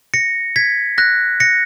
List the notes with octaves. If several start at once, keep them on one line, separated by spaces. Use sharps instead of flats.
A#6 C#7
G#6 B6
F#6 A#6
A#6 C#7